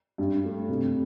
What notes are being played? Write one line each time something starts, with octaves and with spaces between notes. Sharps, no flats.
G2
A3
C3